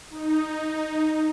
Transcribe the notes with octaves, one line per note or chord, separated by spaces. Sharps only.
D#4